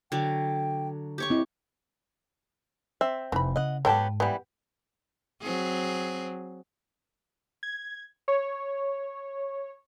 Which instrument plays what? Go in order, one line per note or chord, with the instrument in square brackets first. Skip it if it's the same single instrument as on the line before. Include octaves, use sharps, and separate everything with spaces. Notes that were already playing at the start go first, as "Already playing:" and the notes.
[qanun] D3 F#3 [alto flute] G5
[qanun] G4 C#5 C#6
[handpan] C4 E4 [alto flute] D#5
[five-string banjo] C4 E5
[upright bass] F1 [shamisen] E3 B5
[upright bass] C#3 [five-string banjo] D#5 F#5
[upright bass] G#2 [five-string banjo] F#3 B3 G4 [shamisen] A4 G5 A5
[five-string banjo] E3 G3 [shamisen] B3 G4
[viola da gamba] F#3 C4 G#4
[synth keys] G#6
C#5